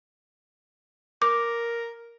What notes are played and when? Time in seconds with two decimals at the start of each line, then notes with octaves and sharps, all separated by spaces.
1.22 A#4 D6